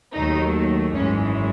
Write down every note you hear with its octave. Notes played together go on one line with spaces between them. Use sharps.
D#2 D#3 F#3 A3 D#4
G#1 F#2 E3 G#3 C#4